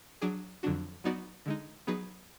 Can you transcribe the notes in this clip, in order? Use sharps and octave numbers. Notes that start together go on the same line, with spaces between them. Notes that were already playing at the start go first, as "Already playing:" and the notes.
F#3 D4 G#4 D5
F2 D3 F#3 D4 F#4
F#3 B3 D#4 F#4 D5
D3 G#3 D#4
F#3 B3 D#4 G#4 B4